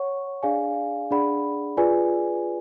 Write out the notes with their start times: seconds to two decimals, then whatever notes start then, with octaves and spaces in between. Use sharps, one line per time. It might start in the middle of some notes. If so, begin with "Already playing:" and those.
Already playing: C#5 F#5 C#6
0.43 D4 G#4 D5 F5 G#5
1.11 D4 G#4 D5 F#5 B5
1.77 F4 G#4 B4 D5 G#5